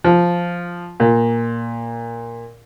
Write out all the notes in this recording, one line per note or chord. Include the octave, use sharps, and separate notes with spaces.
F3
A#2